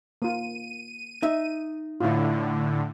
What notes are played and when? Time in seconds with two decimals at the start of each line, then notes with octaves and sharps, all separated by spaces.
0.22 A#3 F4 D#7
1.22 D#4 E5
2.01 A2 D3 E4 F4